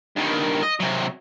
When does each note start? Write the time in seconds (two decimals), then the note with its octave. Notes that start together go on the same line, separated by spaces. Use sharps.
0.16 G2 D#3
0.63 D#5
0.80 C3 F#3